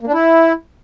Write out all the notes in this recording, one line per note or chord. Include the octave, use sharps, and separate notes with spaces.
A#3
D4
E4